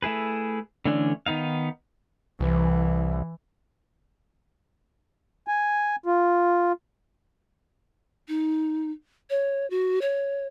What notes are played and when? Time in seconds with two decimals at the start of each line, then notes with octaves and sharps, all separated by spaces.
0.02 A3 E4 G#4 B4
0.85 D3 E3 A3 C#4 D4
1.26 D#3 B3 D#4 F5
2.40 C2 E3
5.48 G#5
6.06 F4
8.28 D#4
9.30 C#5
9.70 F#4
10.02 C#5